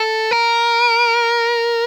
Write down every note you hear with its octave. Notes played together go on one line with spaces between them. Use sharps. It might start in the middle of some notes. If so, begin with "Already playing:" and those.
Already playing: A4
A#4